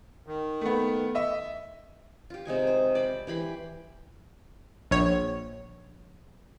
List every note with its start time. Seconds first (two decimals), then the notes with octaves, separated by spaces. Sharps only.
0.27 D#3
0.61 A3 B3
1.15 D#5 E5
2.30 F4 G4
2.45 C3 G#3 D#4 G#5
2.67 C5
2.95 D5 B5
3.27 E3 G4 B5 C6
4.91 A#1 C#5